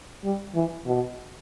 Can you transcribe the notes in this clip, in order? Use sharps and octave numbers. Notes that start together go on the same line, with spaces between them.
G3
E3
B2